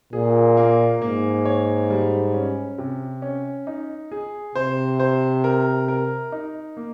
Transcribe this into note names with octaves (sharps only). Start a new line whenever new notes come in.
A#2 G#4
A#3
G#2 A#3
C#5
G3
C#4
C3
C#4
D#4
G#4
C3 C5
C5
A#4
A#4
D#4
A#3